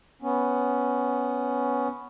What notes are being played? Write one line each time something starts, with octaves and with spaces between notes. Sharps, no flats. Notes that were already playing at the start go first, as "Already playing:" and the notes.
B3 C#4